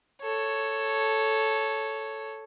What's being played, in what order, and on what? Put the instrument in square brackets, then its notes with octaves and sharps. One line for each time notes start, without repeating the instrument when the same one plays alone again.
[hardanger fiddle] A4 C#5